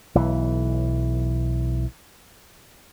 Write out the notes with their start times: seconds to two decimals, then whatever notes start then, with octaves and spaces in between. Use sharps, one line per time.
0.15 B1 E3